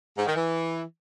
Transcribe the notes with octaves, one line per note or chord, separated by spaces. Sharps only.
G#2
D#3
E3